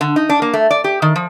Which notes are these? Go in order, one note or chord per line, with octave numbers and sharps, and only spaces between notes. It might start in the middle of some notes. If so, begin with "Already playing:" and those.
D3
D#4
D4
A#3
A3
D5
G4
D#3
F3